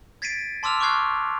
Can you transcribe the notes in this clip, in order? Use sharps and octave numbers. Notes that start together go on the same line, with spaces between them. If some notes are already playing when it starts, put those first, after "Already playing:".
G#6 A6 B6 C7 D7 D#7
A5 C6 D6 E6 F6 F7
C#6 D6 F6 F#6 G#6 C7